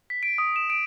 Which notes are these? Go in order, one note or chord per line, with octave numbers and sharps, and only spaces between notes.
B6
D7
D#6
E7
D7